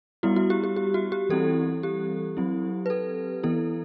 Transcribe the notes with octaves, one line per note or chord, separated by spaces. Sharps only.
G3 B3 E4 F#4
F#4
G4
G4
G4
F#4
G4
E3 G3 C4 E4 A4
G4
F#3 C4 E4
B4
A4
E3 B3 E4 A4